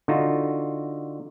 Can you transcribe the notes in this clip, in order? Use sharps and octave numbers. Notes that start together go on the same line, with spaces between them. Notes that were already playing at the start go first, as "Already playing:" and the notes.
D3 D#4 F4 F#4